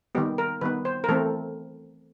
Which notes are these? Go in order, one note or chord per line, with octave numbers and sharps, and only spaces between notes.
D#3 G3 B3 G4
A#4
D#3 G3 B3 B4
C5
A#4
E3 A3 C4 A4